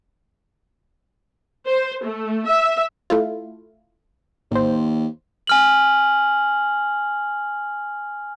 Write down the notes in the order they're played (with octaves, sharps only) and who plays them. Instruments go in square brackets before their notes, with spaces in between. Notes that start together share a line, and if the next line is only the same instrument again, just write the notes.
[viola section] C5
A3
E5
[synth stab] A3 E4 F4
[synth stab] A1 C5 [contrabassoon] D#2
[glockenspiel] G#5 F6 F#7